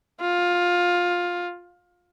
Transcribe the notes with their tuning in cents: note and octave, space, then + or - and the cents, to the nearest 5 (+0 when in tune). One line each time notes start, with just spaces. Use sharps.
F4 +15